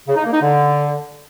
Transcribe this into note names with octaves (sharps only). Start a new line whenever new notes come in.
C#3
D#4
A#3
D#4
D3